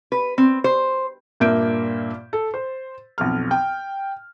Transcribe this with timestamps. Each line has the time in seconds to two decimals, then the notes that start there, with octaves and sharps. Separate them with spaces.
0.12 B4
0.38 C4
0.64 C5
1.40 G2 A#2 A#3 E5 G6 D7
2.33 A4
2.54 C5
3.18 B1 F2 F6
3.51 G5